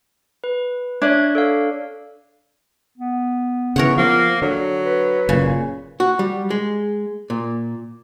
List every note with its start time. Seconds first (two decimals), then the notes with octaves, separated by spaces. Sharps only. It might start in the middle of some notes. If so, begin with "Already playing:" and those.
0.44 B4
1.02 D4 C#5 E5 G#6
1.35 A4 C#5 F5
2.98 B3
3.76 C#3 E3 A#4 C#5 F#5
3.98 F3 A#3
4.42 D3 F#3
4.86 B4
5.29 F#1 A#2 C#3
6.00 F#4
6.19 G3
6.50 G#3
7.30 A#2